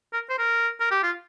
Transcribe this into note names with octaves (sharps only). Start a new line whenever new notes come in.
A#4
C5
A#4
A#4
G4
F4